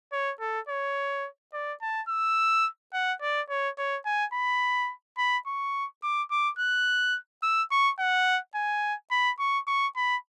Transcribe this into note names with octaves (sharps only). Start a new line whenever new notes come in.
C#5
A4
C#5
D5
A5
E6
F#5
D5
C#5
C#5
G#5
B5
B5
C#6
D6
D6
F#6
E6
C#6
F#5
G#5
B5
C#6
C#6
B5